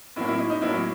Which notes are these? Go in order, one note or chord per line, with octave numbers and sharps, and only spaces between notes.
A2 F#3 A#3 E4
E4
D#4
D#4
A2 F#3 A#3 E4